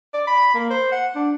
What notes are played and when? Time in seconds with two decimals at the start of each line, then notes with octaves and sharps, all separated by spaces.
0.14 D5
0.27 B5
0.54 A#3
0.70 C5
0.92 F#5
1.15 D4